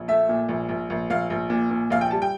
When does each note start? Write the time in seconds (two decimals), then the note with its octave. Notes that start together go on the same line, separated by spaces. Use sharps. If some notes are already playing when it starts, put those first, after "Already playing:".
Already playing: A#1
0.08 A3 E5
0.29 A#2
0.49 A#1
0.69 A#1
0.90 A#1
1.10 A#1 F5
1.30 A#1
1.50 A#2
1.71 A#2
1.90 A#1 F5
2.01 G5
2.11 G3 A5
2.22 G5